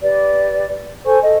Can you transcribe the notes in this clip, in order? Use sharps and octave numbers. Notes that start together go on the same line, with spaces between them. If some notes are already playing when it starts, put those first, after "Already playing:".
G4 B4 D5
A4 C5 G#5 C#6
A4 D#5